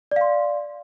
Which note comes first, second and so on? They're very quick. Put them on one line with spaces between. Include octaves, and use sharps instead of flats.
D5 F5 C6